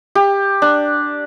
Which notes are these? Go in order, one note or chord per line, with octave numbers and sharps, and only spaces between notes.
G4
D4